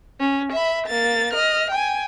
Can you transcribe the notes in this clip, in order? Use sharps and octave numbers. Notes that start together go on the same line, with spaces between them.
C#4
E5 B5
A#3 A6
D#5 F6
G5 G#5